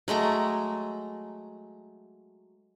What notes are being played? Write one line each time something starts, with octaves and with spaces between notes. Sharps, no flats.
F#3 G#3 A3 A#5